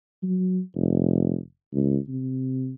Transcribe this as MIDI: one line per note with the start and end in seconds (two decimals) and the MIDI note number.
0.23 0.60 54
0.75 1.38 29
1.73 1.97 37
2.08 2.74 48